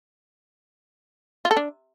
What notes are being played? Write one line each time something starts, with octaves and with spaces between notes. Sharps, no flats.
F4
A4
D4